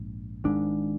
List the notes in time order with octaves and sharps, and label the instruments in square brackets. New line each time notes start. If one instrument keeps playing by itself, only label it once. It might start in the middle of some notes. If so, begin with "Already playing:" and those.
Already playing: [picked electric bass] A#1 G#2
G#1 G#2 D4